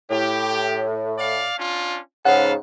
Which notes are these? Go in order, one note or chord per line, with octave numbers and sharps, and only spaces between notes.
A2 G4
D5 F5
C#4 D4 F4
G#2 C#3 A4 B4 F5 F#5